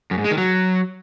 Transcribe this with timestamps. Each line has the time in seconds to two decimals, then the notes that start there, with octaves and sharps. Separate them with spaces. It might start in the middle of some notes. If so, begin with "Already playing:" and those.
0.11 F#2
0.18 G#2
0.24 G#3
0.31 D#3
0.38 F#3